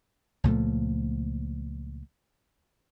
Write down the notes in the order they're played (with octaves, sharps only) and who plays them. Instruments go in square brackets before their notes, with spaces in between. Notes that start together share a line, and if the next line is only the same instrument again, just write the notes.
[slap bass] C#2 A#2 F3 A3